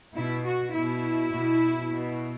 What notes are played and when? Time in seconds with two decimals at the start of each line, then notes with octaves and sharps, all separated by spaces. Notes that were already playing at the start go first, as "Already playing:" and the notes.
0.16 B2 E4
0.45 F#4
0.74 B2 E4
1.33 B2
1.93 B2